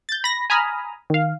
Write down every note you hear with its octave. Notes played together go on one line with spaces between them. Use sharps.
G6 A6
B5 A#6
G#5 A#5 B5 D#6 F6
D#3 F5